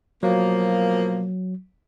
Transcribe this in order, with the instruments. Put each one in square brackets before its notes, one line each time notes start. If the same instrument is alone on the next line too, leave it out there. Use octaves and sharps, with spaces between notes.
[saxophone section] B2 F3 A#3 [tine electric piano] F#3